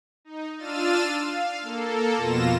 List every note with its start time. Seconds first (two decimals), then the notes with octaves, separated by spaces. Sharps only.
0.25 D#4
0.57 D4 F4 E6 F6 A6 D#7
1.18 F5
1.62 A#3 A4
2.15 F2 B2 F4 A#6 E7